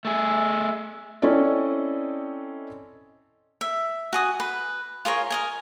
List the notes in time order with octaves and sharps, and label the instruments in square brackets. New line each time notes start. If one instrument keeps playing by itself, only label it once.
[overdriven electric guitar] A3 G#4 [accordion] E5
[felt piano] C4 C#4 E4 A4 D5 D#5
[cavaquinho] E5
F#4 G#5 D#6
B4
F4 G#4 A#4 C#5
A#4 D#5 G#5